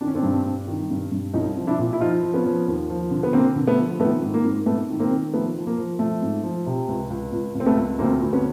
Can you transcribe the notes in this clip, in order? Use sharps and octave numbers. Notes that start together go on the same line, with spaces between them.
D#3 D4
C#4
C4 D4
G2
G2
D#3
G2
G2
C2 C#4 D#4
F3
D4 E4
A#2
E4
F3 D#4 F4
F3
B3 C#4
F3
D#2
F3
D3
B3
D3 A#3 C4
D3
A3 B3
F3
D#3 A3 B3
G#2
A#3
G#2
G#2 A3 B3
D#3
A#3 C4
D#3
F3 A3 B3
F3
A#3
F3
F3 A3
G#2
F3
C3
C#2
C#2
C#2
C#2
C4
A3 B3
C#2
D2 A#3 C4
D2
B3 C#4